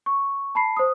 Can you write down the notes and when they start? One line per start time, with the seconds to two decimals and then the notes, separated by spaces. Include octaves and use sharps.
0.06 C#6
0.55 A5 B5 C7
0.77 C5 D#6